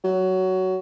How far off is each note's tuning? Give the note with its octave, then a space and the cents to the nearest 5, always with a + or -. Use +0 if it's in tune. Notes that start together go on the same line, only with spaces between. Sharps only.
F#3 +15